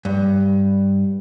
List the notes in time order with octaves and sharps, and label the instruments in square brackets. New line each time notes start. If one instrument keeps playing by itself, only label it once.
[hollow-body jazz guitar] G2